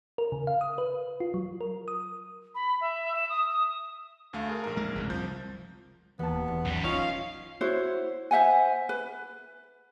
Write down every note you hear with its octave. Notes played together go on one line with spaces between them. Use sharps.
A#4
C#3
F5
D#6
B4
F4
F#3
A#4
D#6
B5
E5
E7
D#6
D#6
D2 A3 F5
G#4 A#4
A#1 G#2 A#4
G#3
F1 C#2 F#2
C2 F3 G6
D#2 E3 B3 A5
D#1
E2
B1 F#2 G3
D1 C#4 D#4 F4 F5
E4 F#4 C5 C#5
C5 E5 F#5 G#5
B4